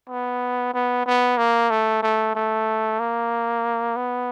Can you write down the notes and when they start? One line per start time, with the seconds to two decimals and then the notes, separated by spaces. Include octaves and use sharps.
0.09 B3
0.74 B3
1.06 B3
1.38 A#3
1.70 A3
2.02 A3
2.35 A3
3.00 A#3
3.96 B3